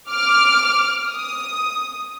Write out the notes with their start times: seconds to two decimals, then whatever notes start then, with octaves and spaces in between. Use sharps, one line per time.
0.11 D6 F6
1.08 D#6